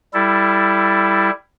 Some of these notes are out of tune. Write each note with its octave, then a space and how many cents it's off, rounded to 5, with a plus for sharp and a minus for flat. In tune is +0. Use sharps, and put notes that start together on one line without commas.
G3 +0 E4 +10 A4 +0